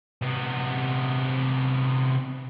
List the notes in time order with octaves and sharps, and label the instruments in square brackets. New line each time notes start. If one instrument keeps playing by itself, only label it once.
[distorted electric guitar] C3 B3